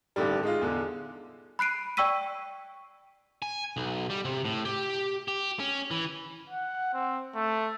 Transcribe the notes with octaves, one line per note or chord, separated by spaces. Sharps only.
A1 D3 D#3 G3
G#3 D#4 F4
E2 D3
B5 F#6 C7 D7 D#7
D5 G5 C#6 E6 B6 D#7
G#5
B1
G3
C3
A2
G4
G4
C#4
E3
F#5
C4
A3